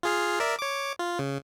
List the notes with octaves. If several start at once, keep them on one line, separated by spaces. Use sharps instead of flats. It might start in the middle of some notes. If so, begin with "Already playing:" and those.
F4 G#4 F5
A#4 D5 E5
C#5 D6
F4
C#3